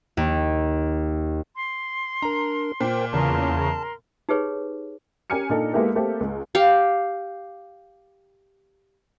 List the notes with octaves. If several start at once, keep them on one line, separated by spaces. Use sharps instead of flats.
D#2
C6
D4 A#4 A#5
A#2 A#4 C5 G5
E2 C#3 A#4 A5 C6
D#4 G4 G#4 B4 C#5
C#4 G4 A#4 G#5 F6 C#7
A#2 D4 D#4 A4
G#3 A#3 B3 E4 G4 A4
A3 A#3 C4 G4 A4
C#2
G4 F5